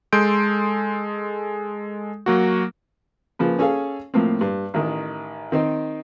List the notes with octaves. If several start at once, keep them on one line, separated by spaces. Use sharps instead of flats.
G#3 A4 C6 G6 D7
F#3 A#3 F#4
C#3 F3 A#3 B4
C#4 G#4 A4 F5
A2 F3 A#3 C4
G2
A1 D#3
D#3 C4 D#4